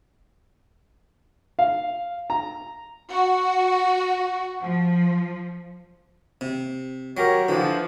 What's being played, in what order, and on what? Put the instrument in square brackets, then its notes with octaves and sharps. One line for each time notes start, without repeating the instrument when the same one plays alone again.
[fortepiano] F5
A#5
[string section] F#4
F3
[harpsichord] C3
[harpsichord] F#3 [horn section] G4 A#4 C#5
[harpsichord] D3 [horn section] E3 F3